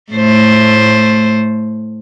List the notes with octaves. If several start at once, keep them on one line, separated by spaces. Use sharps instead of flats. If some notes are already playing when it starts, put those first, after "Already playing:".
A2 A3 C5